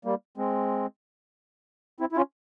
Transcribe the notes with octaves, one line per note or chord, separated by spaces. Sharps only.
G3 A#3
G#3 C4
C4 E4
E4
C#4 F4